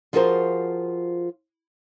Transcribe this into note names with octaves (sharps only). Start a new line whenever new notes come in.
F3 F4 F#4 G#4 A#4 C5